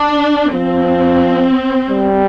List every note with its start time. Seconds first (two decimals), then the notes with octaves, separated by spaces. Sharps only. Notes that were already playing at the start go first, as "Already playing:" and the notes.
Already playing: D4
0.53 F3 C4
1.90 G3